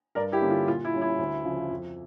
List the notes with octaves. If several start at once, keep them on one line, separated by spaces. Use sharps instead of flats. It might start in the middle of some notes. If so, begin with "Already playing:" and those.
G2 A#4 D5
E4 G4
D3 G3 A#3 C#4
F4
A#2 F4
E4
G3 C#4
E4
D2
C#3 F3
F2